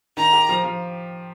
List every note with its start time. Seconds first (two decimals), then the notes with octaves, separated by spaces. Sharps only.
0.17 D#3 A#5
0.33 G4
0.49 F3
0.64 F3